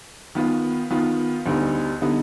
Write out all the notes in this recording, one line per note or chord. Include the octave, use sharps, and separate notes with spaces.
D#3 B3 F4
D#3 B3 F4
D2 D3 G3 B3 D#4
D3 G3 B3 D#4